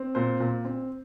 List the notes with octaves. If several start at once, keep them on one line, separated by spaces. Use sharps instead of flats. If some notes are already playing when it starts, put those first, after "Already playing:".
Already playing: C4
A#2 C5
A#2
C4